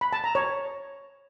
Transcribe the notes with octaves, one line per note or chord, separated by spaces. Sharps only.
B5
A5
A#5
C#5